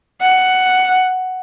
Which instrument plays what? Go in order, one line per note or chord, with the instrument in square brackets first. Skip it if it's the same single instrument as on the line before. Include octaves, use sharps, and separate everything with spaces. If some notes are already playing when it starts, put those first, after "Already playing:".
[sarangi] F#5